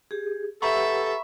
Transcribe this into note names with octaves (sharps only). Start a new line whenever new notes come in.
G4 G#4
G4 A4 B4 E5 F#5 A#5 B5 C#6